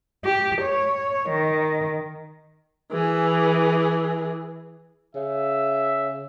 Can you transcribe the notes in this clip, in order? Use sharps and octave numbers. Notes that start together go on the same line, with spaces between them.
G4
C#5
D#3
E3 G#4
C#3 E5